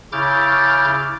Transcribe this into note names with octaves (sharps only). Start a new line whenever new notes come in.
C#3 E4 D6 F6 G6 A6